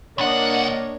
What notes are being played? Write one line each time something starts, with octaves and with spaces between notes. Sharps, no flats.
C2 A#3 D4 C#5 D#5 F#5